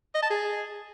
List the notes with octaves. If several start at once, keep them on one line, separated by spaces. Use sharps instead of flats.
D#5
A5
G#4